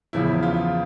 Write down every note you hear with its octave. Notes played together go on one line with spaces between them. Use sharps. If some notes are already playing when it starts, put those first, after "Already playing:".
E2 C#3 F3 E4
F4